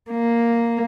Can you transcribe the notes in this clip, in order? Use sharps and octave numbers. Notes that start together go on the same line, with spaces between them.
A#3